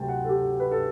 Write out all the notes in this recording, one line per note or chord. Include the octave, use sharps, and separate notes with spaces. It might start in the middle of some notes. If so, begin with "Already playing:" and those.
Already playing: D2 C3 F#3 G5 A5
F#5
A4
G4
B4
A4